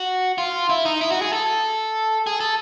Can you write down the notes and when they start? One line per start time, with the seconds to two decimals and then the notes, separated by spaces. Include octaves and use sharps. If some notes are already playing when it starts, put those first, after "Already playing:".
Already playing: F#4
0.38 F4
0.70 E4
0.85 D#4
1.01 E4
1.12 F#4
1.22 G#4
1.33 A4
2.27 G#4
2.40 A4